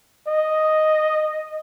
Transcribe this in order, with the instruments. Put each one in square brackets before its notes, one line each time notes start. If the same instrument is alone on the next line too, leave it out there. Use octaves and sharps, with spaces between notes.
[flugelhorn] D#5